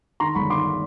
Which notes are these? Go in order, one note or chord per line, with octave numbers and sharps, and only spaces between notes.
D#3 A#5 C6
G1 B5 C#6
D#3 C6 D6